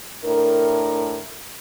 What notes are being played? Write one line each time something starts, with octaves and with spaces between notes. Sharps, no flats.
A2 D4 A#4